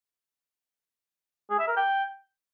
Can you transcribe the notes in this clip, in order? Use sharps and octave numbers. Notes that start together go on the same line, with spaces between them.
G#4
E5
A#4
G5